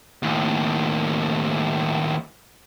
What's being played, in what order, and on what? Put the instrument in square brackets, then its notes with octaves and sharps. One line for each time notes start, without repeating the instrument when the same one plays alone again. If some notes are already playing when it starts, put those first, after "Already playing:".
[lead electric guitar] D#2 A2